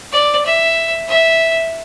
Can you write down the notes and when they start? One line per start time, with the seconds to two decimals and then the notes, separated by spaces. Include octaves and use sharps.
0.12 D5
0.45 E5
1.08 E5